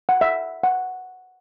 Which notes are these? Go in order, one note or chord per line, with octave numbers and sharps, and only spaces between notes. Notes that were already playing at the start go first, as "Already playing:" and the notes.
F#5
E5
F#5